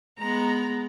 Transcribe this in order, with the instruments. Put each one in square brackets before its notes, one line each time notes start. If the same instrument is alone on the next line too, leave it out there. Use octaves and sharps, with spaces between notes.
[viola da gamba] G#3 B3 [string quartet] A#5